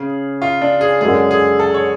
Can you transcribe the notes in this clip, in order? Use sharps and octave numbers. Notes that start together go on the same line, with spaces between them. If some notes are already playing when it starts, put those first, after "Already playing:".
Already playing: C#3 G#4
F4
D4
G#4
F#2 D3 G#3 G#4
G#4
A4
C#5